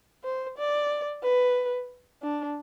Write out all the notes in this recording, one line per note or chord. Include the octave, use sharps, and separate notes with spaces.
C5
D5
B4
D4